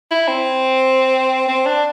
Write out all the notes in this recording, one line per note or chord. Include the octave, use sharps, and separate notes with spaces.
E4
C4
C4
D4